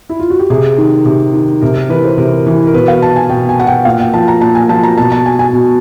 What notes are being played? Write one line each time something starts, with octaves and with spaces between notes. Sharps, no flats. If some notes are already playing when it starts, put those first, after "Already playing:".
E4
F4
F#4
G4
C3 G#4
D#3
C3
D#3
C3 A#4
A#4
E3 B4
C5
C3 A#4
E3
A#4
B2 B4
F5
A5
G#5
B2 G5
G#5
F#5
G5
A#2 F5
G5
F3 A5
A#5
A#2 A5
G#5
F3 A5
A#5
B2 A5
A5
G#5
G#5
B2